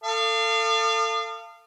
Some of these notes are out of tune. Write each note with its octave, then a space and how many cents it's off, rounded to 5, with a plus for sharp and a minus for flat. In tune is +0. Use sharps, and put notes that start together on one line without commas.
A4 +30 F5 -25 D#6 -40